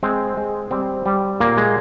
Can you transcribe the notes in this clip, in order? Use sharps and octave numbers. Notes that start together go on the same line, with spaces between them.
G#3 C4
G#3
G3 C4
G3
A#2 A#3
G#3